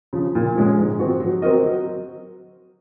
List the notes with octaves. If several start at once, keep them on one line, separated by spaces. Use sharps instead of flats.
C#3 F3
A#2
F3 G#3 C#4 G#4
G#2
F3 C4 F#4
F#3
C4 F#4 A#4 D#5
F#3